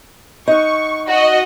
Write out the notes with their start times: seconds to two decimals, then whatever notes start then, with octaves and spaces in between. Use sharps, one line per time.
0.48 D#4 F#5 C#6
1.09 F#4 D#5